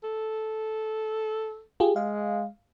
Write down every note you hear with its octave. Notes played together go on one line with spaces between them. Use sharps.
A4
F4 G4 G#4
G#3 F5